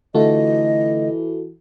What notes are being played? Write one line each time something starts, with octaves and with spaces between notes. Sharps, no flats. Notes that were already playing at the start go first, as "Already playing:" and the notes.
D3 E3 A3 F4 F#4 A4 D#5